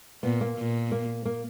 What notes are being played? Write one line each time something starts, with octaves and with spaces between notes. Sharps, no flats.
A#2 B3
A#3
A#2
A#3
A#3